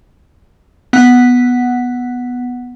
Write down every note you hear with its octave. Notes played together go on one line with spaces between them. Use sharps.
B3 F#5